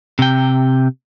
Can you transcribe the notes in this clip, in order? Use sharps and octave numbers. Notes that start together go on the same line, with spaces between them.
C3 G5